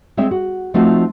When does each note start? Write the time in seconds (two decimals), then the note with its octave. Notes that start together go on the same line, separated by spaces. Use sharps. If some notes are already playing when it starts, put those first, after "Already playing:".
0.17 G#3 C4 C#5 E5
0.31 F#4
0.74 F3 A3 C4 D#4 F4 F#4